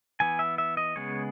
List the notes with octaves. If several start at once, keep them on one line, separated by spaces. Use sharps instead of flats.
E3 B3 G#5
E5
E5
D#5
C#3 G#3 B3 C#5